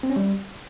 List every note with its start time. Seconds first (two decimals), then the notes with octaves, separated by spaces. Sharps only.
0.03 C4
0.10 C#4
0.16 G3